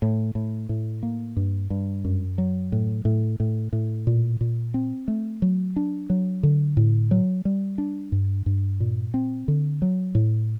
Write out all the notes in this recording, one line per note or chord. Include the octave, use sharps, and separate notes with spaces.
A2
A2
A2
A#3
G2
G2
F#2
F#3
A2
A2
A2
A2
A#2
A#2
C4
A3
F#3
D4
F#3
D3
A2
F#3
G3
D4
G2
G2
A#2
C4
D3
F#3
A2